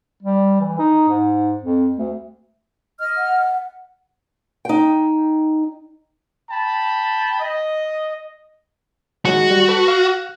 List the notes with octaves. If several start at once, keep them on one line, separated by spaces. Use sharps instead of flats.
G3
E3
D#4
G#2
F2
D2
D#5 F6
F#5
D#4 G5
G5 A5 B5
D#5
D#3 F#3 G#3 F#4
G3
A4 B4
F5 F#6